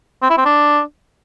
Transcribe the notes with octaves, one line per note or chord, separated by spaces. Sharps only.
C4
E4
C4
D4